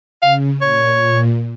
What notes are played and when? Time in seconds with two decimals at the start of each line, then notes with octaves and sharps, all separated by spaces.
0.22 C#3 F5
0.61 A#2 C#5
1.00 A#2